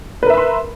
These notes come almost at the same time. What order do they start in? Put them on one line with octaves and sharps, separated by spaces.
B4 A#4 E5 B5 C6